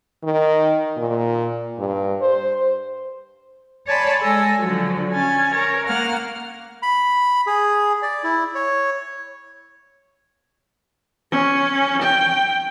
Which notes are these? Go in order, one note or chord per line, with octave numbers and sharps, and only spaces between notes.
D#3
A#2
G2
C5
C#5 D5 G#5 A5 B5 C6
G#3 A4 G#5 A#6
D3 F3 F#3
C#4 G#5 A6
A#4 C#5
A#3 F#5 F6
B5
G#4
D5
E4
C#5
C#4
G5